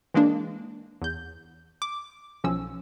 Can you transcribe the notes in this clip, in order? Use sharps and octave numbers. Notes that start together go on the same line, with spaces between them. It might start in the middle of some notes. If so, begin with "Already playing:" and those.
E3 G#3 A#3 D4
E2 G6
D6
B1 F3 C#4 E6